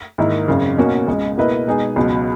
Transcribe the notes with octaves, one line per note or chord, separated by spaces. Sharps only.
G#2 D#3 A#3 E4
G#1 F#2 C#3
B2 A#3 C#4 F#4
C#2 C#3 G#3
B2 A#3 E4 B4 D#5
B2 G#3 B3 D#4 G#4
C#2 B2 F#3